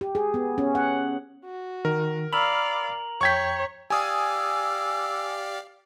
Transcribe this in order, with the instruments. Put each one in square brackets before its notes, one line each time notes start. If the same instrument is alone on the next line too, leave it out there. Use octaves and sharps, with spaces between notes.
[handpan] G4
G#4
B3
C#4
F#5
[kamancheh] F#4
[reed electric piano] D#3 [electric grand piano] A#4
[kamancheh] D5 F5 [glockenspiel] A#5 F7 F#7 [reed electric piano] B5 E6 F6
[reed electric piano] F2 G5 G6 [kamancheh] C#5 [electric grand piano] C#6 G#6 B6
[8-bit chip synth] G4 D5 F5 [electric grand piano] G#5 D#6 [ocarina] E6